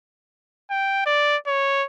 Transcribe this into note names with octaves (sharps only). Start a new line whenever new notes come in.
G5
D5
C#5